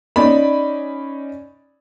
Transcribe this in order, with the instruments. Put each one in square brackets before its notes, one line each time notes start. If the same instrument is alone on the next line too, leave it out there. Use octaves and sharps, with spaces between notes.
[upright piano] C#4 D#4 D5 B5